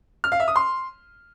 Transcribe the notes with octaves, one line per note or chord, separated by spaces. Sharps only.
F6
F5
E5
D#6
C6